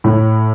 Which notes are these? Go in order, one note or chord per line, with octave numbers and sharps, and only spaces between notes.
A2